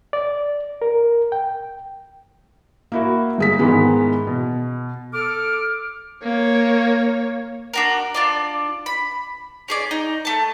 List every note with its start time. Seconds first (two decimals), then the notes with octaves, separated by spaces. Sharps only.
0.13 D5
0.82 A#4
1.32 G5
2.92 A#3 E4 F#4
3.38 G1 G#4 B6
3.59 G#2 D#3 E3 G#3 B3
4.27 B2
5.14 A4 D6 F6
6.23 A#3 C#5
7.74 D4 F#4 A#4
8.15 D4 F4 D5
8.86 B5
9.68 C#4 G#4 D5
9.91 D#4
10.25 A3 A5